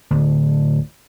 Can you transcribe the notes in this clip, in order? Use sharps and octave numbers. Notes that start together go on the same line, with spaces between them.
D1 D2